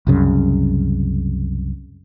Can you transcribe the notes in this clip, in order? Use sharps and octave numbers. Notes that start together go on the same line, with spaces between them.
C2 F#2 C#3